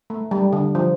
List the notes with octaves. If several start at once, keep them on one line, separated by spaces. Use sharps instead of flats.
A3
G3
D3
F3